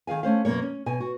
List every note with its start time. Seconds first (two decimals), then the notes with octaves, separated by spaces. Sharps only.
0.07 D#3 G#4 F5 G#5
0.23 A3 C#4 C5 F5
0.45 F#2 B2 A#3 C#5
0.62 C#4
0.86 B2 G#5
1.00 F#4